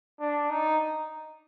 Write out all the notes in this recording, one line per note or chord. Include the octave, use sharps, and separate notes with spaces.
D4
D#4